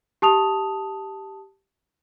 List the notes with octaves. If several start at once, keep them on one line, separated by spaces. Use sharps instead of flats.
G4 A5 D#6 F7